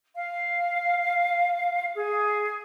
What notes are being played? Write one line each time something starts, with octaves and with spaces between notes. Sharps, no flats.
F5
G#4